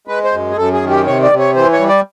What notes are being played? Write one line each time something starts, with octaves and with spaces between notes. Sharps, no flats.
G#3 B4
C5
F#2
G#4
F#2 A4
G#4
D#3
G4
C3 C#5
D5
C3
C#5
E3 C5
C#5
G3
D5